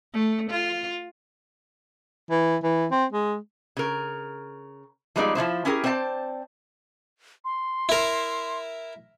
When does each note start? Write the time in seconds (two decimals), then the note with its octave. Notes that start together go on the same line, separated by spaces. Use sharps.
0.13 A3
0.50 F4
2.30 E3
2.63 E3
2.91 C4
3.12 G#3
3.77 C#3 A#4
5.16 F3 G3 G#3 B3 D#4 D5
5.35 F3 F#3 E4 C5
5.65 C#4 E4 G4 G#4 A#4
5.84 C4 C5 D5 E5 A5
7.45 C6
7.89 E4 A#4